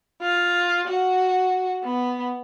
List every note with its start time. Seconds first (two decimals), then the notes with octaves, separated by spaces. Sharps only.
0.22 F4
0.88 F#4
1.84 B3